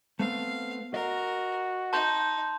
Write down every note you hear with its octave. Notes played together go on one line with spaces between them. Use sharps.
A3 B3 C4 F5
F#4 A#4 D#5
D#4 A5 C6 G6